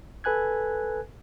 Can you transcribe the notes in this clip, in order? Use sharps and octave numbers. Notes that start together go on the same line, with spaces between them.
A4 B4 G#5 F#6 G#6